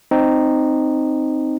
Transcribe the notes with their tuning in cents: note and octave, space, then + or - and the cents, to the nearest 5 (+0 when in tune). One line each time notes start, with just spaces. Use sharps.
C4 +0 D#4 -10